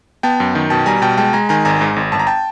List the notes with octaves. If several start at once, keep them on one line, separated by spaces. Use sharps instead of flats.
B3 G5 A5
F#2
D#3
B2 G5 A5
G3 G#5 A#5
B2 G5 A5
G#3 G5 A5
G#3 G#5 A#5
D#3 G#5 A#5
G#1 G#5 A#5
G#2
G#1
G1 A5
A#5
G5 A5